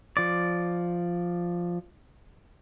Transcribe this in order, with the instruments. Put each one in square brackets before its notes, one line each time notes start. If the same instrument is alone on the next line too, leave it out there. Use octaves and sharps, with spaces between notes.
[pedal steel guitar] F3 D5